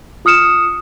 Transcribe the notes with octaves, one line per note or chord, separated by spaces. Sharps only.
F4 D#6 F6 C#7 E7